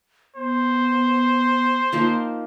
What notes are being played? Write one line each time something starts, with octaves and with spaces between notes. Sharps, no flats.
B3 C5
F3 A#3 D#4